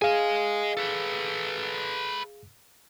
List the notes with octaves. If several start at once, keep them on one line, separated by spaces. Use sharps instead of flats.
G#4 D#5 F5 G#5
A4 B4